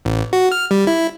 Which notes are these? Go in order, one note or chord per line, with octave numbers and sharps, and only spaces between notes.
A1
F#4
F6
G3
E4